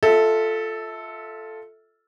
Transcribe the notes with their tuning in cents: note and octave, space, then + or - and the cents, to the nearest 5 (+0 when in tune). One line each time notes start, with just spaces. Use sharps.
F4 +0 A4 +0 E5 -25